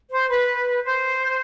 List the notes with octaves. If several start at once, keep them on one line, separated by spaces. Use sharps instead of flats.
C5
B4
C5